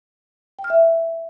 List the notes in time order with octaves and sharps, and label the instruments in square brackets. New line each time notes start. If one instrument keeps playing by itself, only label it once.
[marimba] G5
F6
E5